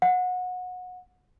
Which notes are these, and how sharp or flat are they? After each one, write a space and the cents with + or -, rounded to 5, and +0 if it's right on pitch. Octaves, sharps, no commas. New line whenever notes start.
F#5 -25